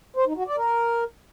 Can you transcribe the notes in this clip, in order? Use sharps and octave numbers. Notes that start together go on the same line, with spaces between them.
C5
D#4
F#4
D5
A#4